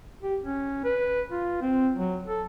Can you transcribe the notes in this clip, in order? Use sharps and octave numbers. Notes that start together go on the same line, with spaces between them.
G4
C#4
B4
F4
C4
F#3
A4